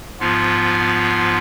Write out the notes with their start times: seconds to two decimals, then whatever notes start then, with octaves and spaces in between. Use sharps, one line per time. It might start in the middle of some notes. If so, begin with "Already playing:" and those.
0.20 G#2 F3 B3 F4